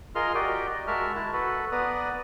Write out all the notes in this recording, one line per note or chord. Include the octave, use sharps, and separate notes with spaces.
F4 G#4 A#4 D#5 C6 F6
F#4 G4 A#4 D5 D#5 G5
G#3 F#4 A#4 E5 A5 F6
E4 A5
F#4 A4 B4
B3 B4 D5 A#5 D#6